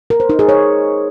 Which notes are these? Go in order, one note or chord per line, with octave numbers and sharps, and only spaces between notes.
A#4
C5
D#4
G#4
C#5